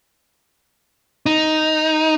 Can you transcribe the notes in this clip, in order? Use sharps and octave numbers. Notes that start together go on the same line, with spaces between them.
D#4